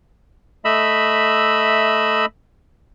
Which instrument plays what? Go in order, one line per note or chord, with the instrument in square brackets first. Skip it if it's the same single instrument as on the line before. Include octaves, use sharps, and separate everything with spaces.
[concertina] A3 D#5 E5 B5 E6